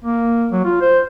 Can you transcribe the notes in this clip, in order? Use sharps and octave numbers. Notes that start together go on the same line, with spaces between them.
A#3
F#3
F4
C5